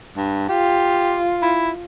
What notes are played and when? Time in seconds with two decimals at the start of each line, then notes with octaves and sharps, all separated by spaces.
0.17 G2
0.49 F4 G4
1.42 E4